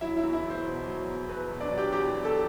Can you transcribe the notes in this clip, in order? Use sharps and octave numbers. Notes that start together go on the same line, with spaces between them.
F#3 E4 E5
E4 E5
E2
E4 E5
E2
C5
B2
F#3
E2
E2 B4
B2
D4 D5
F#3
G4 G5
E2 G4 G5
E2
A4 A5